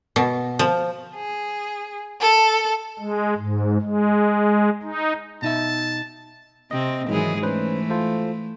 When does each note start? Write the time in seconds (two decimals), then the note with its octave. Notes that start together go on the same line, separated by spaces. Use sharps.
0.16 B2
0.59 F3
1.15 G#4
2.19 A4
2.99 G#3
3.37 G#2
3.82 G#3
4.83 D#4
5.42 B2 D#4 E5 A5
6.71 C3 C4 D#5
7.08 G#2 D#3 E3 F#3 G#3 G#4
7.43 E3 A3 C#4 B4 C5
7.90 F4 A4 C5